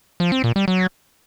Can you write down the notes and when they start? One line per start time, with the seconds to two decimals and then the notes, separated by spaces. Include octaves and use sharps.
0.20 F3
0.32 C4
0.44 A#2
0.56 G3
0.68 F#3